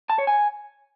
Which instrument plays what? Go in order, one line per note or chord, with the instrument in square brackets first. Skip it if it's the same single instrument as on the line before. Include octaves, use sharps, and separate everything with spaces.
[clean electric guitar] A5
C#5
G#5